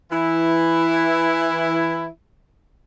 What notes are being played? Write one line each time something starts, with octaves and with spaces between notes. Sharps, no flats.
E3 E4